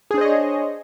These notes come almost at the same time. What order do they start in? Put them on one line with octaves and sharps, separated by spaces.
G#4 D4 C5 D#5 C#5